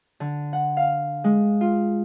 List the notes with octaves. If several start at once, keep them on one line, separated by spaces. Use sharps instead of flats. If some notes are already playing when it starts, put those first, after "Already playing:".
D3
F#5
F5
G#3
F4